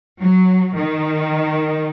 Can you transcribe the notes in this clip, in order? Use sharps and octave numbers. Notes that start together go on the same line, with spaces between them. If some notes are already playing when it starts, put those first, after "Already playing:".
F#3
D#3